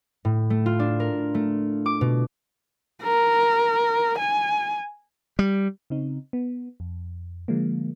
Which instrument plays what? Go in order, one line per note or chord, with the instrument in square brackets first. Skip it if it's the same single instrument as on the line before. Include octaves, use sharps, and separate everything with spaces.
[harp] A2
A3
F4
D4
A#4
A3
D6
B2
[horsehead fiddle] A#4
G#5
[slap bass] G3
[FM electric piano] C#3 C4 D#4
B3
F2
D3 F3 G#3 A#3